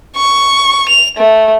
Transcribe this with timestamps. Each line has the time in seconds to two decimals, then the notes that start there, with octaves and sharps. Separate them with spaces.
0.16 C#6
0.89 F7
1.17 A3